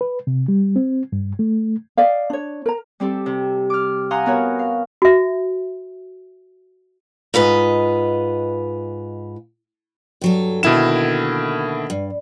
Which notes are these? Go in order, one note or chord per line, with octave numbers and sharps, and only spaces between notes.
B4
C3
G3
C4
G2
A3
D5 D#5 F5
D4 C#5
A#4 A#5
G3 C4 G4 A4
C3
D6 F6
F5 F#5 G#5 A#5 C6 D#6
B3 F#4 A#4 C#5
F5
F#4 E5
G#2 F4 B4 D#5
G2 F#3 A4
B2 D3 D#3 A#3 E4 E7
G2